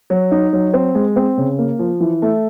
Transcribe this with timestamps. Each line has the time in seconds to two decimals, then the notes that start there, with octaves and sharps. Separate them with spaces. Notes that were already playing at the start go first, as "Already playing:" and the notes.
0.10 F#3
0.31 D#4
0.53 F#3
0.74 C4
0.95 G#3
1.16 C4
1.38 C#3
1.58 A#3
1.79 F3
2.00 E3
2.22 A3